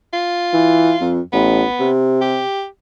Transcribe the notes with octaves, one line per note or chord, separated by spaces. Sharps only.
F4
E3
F2
A1 B3
C3
G4